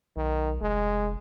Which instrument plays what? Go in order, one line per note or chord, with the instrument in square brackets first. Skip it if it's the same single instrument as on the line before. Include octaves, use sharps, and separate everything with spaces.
[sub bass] B1 [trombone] D#3
[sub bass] F1 [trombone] G#3